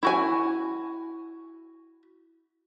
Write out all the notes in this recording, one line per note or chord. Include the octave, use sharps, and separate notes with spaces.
E4 F#4 G#5